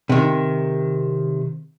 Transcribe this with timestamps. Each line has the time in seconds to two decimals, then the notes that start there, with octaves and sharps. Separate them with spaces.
0.09 C3 D#3